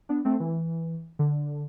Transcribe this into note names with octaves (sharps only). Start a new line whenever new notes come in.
B3 D4
A3 C4
E3
D3